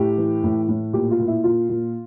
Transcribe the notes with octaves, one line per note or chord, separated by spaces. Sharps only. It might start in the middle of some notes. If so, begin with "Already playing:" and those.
Already playing: A2 G4
E3
A2
A2
A#2 G4
F4
A#2
E4
A#2 F4
A#2